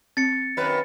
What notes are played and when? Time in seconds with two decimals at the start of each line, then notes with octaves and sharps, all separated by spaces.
0.17 C4 A6 C#7
0.57 F#2 D#3 B4